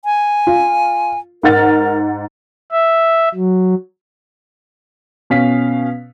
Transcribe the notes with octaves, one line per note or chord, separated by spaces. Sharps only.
G#5
F4
G#2 A#4 F#5 A6
E5
F#3
B2 C#4 F5 B6